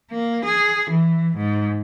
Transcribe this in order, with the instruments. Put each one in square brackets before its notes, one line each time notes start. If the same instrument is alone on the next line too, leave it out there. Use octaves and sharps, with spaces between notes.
[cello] A#3
G#4
E3
G#2